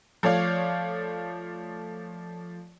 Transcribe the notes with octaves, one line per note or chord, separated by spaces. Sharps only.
F3 A3 C#5 D5 F5